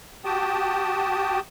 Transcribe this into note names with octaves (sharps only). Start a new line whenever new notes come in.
F#4 G4 G5 A5 D#6